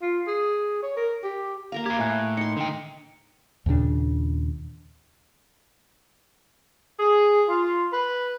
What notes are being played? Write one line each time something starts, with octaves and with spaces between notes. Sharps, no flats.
F4
G#4
C#5
A#4
G4
A#3 A#4 F5 A#5
G4 F5 G#6
A2 E5 G#5 F#6
D#4 C6 C#7
D3 G5
D#2 A#2 C#3 D4
G#4
F4
B4